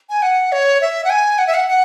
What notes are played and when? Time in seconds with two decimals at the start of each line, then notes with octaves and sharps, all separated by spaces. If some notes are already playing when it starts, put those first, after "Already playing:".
0.10 G#5
0.22 F#5
0.52 C#5
0.81 E5
1.05 F#5
1.10 G#5
1.38 F#5
1.47 E5
1.54 F#5
1.68 F#5